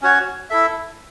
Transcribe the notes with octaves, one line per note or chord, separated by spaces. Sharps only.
C#4 F#4 C#5
E4 A4 E5